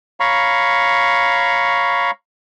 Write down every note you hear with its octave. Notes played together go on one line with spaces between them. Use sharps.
C#5 F5 A#5 B5 C#6